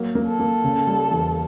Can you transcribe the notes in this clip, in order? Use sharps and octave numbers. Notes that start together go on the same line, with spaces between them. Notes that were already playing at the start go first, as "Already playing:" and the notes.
Already playing: F#3 A#3
A#3
A4
A#3
C#3
G3
E2